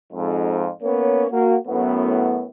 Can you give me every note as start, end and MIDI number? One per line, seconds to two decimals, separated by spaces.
0.13 0.70 41
0.13 0.70 44
0.83 1.26 58
0.83 1.26 59
0.83 1.26 61
0.83 1.26 73
1.31 1.57 58
1.31 1.57 66
1.68 2.47 42
1.68 2.47 45
1.68 2.47 59